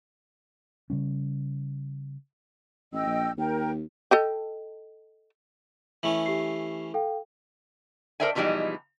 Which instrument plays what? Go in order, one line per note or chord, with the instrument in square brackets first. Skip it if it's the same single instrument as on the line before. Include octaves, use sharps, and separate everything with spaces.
[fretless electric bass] C#3 G3 C#4
[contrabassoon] A1 [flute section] D#5 G5 E6
[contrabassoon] A#1
[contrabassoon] D#2 [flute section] A#4 G5
[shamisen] A4 D#5 G5
[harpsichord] E3 A3 C#4 [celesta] F#7
[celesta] G4 C7
A4 F5 G5
[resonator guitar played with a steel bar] A4 A#4 C5 D5 E5 G#5
B2 E3 F3 G3 G#3 D#4